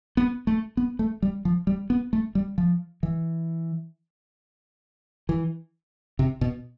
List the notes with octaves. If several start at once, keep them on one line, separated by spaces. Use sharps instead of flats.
B3
A3
B3
A3
G3
F3
G3
B3
A3
G3
F3
E3
E3
C3
B2